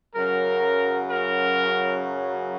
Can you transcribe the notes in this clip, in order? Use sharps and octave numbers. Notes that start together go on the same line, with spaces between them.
F#2 C#3 F#3 A#4
A#4